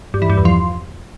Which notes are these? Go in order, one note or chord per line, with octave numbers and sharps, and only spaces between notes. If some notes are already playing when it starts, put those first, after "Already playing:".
G2
E3
G2
E2
F3